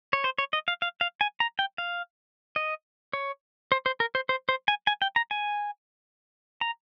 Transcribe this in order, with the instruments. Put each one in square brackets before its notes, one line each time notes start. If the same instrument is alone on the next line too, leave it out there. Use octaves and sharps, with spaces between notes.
[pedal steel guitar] C#5
C5
C#5
D#5
F5
F5
F5
G#5
A#5
G5
F5
D#5
C#5
C5
C5
A#4
C5
C5
C5
G#5
G#5
G5
A#5
G#5
A#5